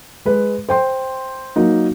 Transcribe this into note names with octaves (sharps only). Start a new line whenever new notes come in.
G#3 B4
C5 G5 C6
F#3 A#3 D#4